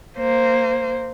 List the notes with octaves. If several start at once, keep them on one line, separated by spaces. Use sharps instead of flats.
A#3 C5